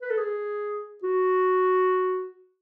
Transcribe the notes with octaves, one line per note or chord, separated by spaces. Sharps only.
B4
A4
G#4
F#4